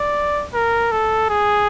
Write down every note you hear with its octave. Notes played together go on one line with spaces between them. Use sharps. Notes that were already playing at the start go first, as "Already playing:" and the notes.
Already playing: D5
A#4
A4
G#4